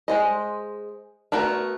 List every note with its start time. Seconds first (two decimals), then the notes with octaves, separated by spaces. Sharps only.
0.08 G#3 C5 D#5
1.32 A3 B3 F#4 A#4